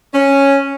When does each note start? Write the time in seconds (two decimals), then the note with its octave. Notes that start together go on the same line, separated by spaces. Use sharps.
0.14 C#4